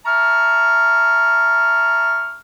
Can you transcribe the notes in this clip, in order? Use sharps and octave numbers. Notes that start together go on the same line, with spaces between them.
E5 A5 A#5 C#6 F6